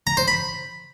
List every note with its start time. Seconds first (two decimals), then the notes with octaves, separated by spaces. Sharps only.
0.07 A#5
0.17 C5
0.28 B5